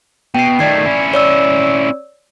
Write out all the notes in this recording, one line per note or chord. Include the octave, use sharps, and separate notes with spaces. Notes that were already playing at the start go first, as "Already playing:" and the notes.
B2 G5 C7
D#3 A3 D5 G#6 C7
C#4 E4
C#5 D5 E6